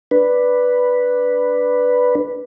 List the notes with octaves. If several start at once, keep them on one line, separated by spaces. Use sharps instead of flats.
D4 B4